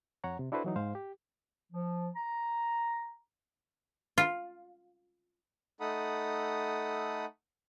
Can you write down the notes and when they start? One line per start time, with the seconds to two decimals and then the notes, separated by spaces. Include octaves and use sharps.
0.24 F2 C#5 F#5 A#5
0.39 C3
0.52 D4 E4 F#4 A4 B4 C5
0.64 E3 F#3 D#4
0.76 G#2 G#3 C5 F5
0.95 G4
1.72 F3
2.16 A#5
4.18 F4
5.80 A3 D#4 A4 F#5 B5 D#6